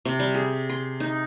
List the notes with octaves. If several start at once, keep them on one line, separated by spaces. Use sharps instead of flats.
C3
G3
G#4
C6
D#4